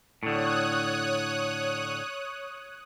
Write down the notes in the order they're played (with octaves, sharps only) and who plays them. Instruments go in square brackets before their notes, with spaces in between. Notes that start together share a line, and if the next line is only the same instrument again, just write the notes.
[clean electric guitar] A2 D3 [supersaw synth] C#5 D#6 F#6